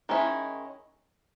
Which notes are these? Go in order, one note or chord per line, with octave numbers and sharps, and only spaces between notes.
D#3 G#3 C#4 E4